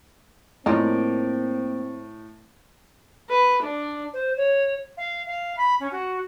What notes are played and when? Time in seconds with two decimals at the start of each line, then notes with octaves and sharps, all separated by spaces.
0.66 A2 F3 A#3 C4 C#4 D#4 D5 A#5
3.29 B4
3.63 D4
4.13 C5
4.36 C#5
4.97 F5
5.26 F5
5.57 B5
5.79 C#4
5.91 F#4